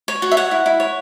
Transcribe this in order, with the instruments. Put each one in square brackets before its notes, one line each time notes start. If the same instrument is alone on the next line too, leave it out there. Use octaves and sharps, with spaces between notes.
[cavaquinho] C#5
F#4
E5
C#5 F#5
E4
E4
C#5